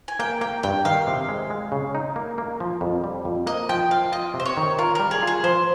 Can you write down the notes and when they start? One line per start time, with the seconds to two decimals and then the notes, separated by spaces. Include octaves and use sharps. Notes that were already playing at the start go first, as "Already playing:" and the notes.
0.08 G#5
0.19 A#3 G5
0.41 A#3 G5
0.63 G2 G5
0.85 D#3 F5
1.07 C3
1.29 G#3
1.50 G#3
1.72 C#3
1.95 D#4
2.16 A#3
2.38 A#3
2.60 F3
2.81 F2
3.04 G3
3.25 F2
3.47 A#3 D#5
3.69 F3 G5
3.91 F4 F5
4.12 F4 D#5
4.34 C3
4.40 C5
4.46 C#5
4.57 D#3
4.79 F4 A#4
4.95 G3 A#4
5.11 G#4
5.23 F4 G#4
5.43 F3 C5